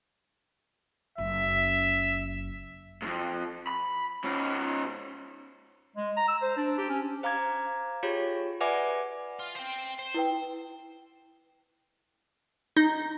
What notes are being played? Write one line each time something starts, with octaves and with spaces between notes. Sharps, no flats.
F#1 E5
F2 G#2
B5
G#2 C#4
G#3
A#5
E6
C5
D4
G4
C#4
C5 F5 A#5 D6 G#6
F4 G4 G#4 C#5
B4 D5 E5 F#5 G#5 D6
F4
C5 G5
C5
E4 B4 G5
D#4